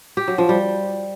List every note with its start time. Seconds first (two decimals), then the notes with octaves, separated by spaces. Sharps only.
0.17 G4
0.28 F#3
0.38 F3
0.49 G3